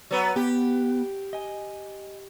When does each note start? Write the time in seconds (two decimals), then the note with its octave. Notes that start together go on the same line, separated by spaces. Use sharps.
0.11 F#3 B3
0.36 B3 G4
1.33 D#5 G#5